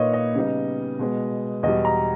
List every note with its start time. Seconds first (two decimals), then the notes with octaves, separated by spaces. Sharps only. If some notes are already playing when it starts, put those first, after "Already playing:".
Already playing: A#2 A#3 D#4 B4 C#5 D#5
0.13 D#5
0.35 C#3 G3 B3 D#4
0.99 B2 G#3 B3
1.63 E2 B2 G3 D#5
1.85 A#5